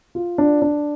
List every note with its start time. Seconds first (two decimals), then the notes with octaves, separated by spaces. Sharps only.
0.15 F4
0.38 D4
0.62 D4